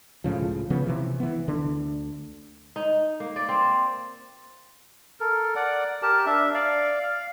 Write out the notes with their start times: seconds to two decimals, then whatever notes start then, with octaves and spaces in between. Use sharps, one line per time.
0.24 C#2 A2 C#3 F3
0.70 C#3 F3 B3
0.87 C3 E3
1.20 E3 B3
1.48 D2 D3
2.76 D#4
3.20 A#3
3.36 D5
3.49 C4
5.20 A4 A#4
5.56 D5 F#5
6.02 G4 A#4 A5
6.26 D4 E5
6.54 D5 F5
7.03 F5